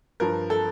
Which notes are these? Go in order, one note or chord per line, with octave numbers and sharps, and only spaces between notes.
G2 F3 A#4
A4